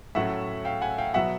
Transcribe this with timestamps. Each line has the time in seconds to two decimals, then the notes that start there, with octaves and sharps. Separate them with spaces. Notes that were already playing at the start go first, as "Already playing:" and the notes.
0.15 A2 F#3 A3 C#4 E5 F#5
0.65 F5 G5
0.81 F#5 G#5
0.98 F5 G5
1.14 B2 F#3 B3 E5 F#5